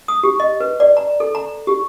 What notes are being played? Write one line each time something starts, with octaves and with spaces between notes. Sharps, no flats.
D#6
G4
D#5
B4
D5
A#5
A4
A#5
G4